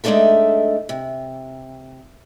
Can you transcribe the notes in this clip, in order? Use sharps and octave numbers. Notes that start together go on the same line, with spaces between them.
G#3 A3 D4 D#4 A4 E5
C3